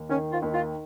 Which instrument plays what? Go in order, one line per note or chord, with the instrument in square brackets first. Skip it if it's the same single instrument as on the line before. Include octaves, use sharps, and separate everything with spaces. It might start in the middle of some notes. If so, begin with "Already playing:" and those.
Already playing: [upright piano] D#2
[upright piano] D#3 [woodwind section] C#4
[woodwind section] F4
[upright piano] D#2
[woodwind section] F4